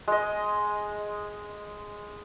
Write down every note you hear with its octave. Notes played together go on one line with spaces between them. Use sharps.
G#3 D#5